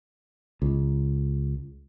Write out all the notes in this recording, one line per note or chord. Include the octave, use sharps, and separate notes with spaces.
C#2